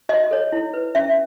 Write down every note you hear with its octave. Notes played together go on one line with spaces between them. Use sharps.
F#4 D#5
A4 C#5
E4
B4
C#4 E5